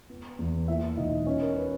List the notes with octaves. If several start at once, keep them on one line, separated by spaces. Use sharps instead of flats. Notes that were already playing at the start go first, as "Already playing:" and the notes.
B3
E2
A#3 E4 E5
E1 D#4 D#5
B3 C#4 C#5
A#4
B4